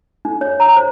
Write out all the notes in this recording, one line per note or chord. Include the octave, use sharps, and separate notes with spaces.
D4
C#5
A#5
C5